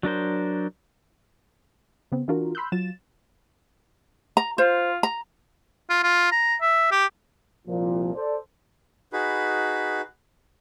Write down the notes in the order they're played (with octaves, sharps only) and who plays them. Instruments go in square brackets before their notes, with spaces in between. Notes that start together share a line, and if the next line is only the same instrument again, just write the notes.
[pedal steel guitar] F#3 D4 A#4 C5
[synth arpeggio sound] C#3 B3 C4
E3 D4 F4 F#4 A#4
B5 C6 E6 F#6 G6
F#3 F4 A6 E7
[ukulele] A#5
[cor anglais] F4 [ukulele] C5
[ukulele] A#5
[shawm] F4
F4
A#5
E5
G4
[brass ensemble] C2 A#2 F3
A4 C5 D5
[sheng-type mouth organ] D#4 F#4 G#4 B4 B5